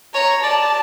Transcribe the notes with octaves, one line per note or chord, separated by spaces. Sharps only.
C#5 A#5
D5 A5